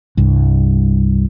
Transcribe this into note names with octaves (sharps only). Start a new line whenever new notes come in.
C2 G2